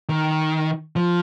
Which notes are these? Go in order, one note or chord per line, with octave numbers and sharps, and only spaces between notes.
D#3
F3